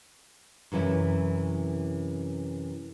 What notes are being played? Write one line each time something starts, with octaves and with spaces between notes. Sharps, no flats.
F#2 C3 E3 C#4 E4